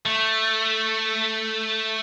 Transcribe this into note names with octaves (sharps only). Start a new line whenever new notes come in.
A3